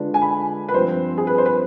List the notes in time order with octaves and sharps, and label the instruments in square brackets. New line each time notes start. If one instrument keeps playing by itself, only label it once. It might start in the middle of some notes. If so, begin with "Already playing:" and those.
Already playing: [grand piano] D3 G#3 D4 F4 B4
[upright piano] G#5
B5
B4
[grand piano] G2 F3 C4 [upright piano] C5
[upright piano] G#4
B4
C5
B4